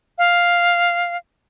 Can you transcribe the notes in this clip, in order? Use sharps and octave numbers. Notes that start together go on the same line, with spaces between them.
F5